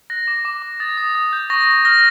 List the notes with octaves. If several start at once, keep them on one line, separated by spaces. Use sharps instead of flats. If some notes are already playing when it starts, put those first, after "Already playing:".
F#6 A#6
D6
D6
D6
D#6 A6
D#6
D#6
G6
C#6 A#6
C#6
F6 A#6